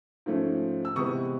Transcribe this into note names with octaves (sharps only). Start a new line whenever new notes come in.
G#2 F3 A3 C#4
E6
C3 E3 G#3 B3 C#6 D#6